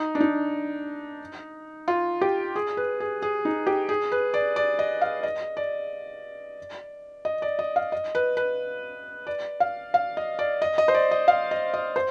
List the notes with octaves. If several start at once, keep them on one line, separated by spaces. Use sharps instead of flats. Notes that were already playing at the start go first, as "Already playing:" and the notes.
Already playing: D#4
D4
D#4
F4
G4
G#4
B4
G#4
G#4
D#4
G4
G#4
B4
D5
D5
D#5
F5
D#5
D5
D#5
D5
D#5
F5
D#5
B4
B4
D5
F5
F5
D#5
D5
D#5
D#5
C5
D5
D#5
F5
D#5
D#5
C5